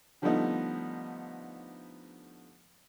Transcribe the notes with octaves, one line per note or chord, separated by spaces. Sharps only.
D3 F3 G3 A3 B3 D#4